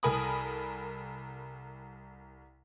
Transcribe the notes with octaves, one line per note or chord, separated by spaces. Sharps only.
C2 A4 A#4 G#5 B5 D#6